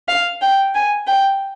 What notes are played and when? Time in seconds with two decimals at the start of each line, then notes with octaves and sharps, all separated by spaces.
0.08 F5
0.42 G5
0.75 G#5
1.07 G5